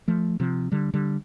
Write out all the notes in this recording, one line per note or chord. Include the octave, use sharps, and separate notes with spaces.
F3 A3
C3 F3
D3 G3
D3 G3